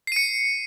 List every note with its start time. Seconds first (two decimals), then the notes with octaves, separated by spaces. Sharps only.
0.07 C7
0.12 D#7
0.16 C#7